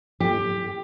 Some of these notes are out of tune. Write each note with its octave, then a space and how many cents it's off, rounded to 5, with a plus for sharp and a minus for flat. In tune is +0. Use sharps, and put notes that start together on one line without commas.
G4 +15